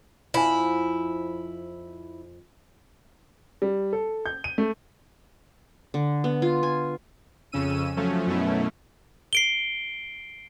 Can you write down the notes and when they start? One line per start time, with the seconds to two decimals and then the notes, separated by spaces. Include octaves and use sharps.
0.34 F2 F3 E4 G#5
3.62 G3
3.93 A4
4.26 G6
4.44 D#7
4.58 A3
5.94 D3
6.24 B3
6.42 F4
6.63 G#5
7.52 F2 C#3 C#4 E6 D#7
7.97 F3 F#3 A3 C#4
8.27 F#2 B2 A3 C#4 E4
9.33 C7 D7 G7